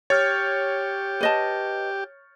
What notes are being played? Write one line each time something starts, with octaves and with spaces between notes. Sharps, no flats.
G4 C#5 F6 G6 A6
B4 D#5 A5